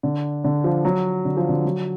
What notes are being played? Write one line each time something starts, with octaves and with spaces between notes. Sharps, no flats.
D3
D3
F3
F#3
D3
F3
D3
F#3